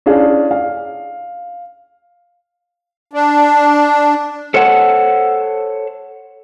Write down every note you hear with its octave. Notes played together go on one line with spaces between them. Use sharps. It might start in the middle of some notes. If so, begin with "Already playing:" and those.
C#4 D4 E4 G#4 F5
F5
D4
A4 C5 C#5 F#5